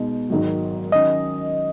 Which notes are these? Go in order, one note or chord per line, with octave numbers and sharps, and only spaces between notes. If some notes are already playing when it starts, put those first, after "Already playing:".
Already playing: B2 G#3 D#4
G#1 G#2 D#3 F#3
D#3 F#3 C#4 D#5